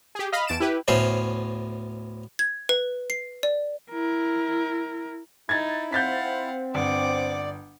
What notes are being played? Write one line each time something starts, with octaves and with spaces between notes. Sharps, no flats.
G4 G#4
D#5 F5 B5 F6
E2 A5 D7 E7
E4 G4 B4
D2 A2 B3 C#4 C5 C#5
G#6
B4
C7
D5
E4 A#4
D#4 E4 G#6 A6
C4 F5 F#5 G6 A6 B6
G1 D5 F#5 D6